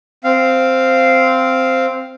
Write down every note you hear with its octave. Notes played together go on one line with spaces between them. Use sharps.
C4 F5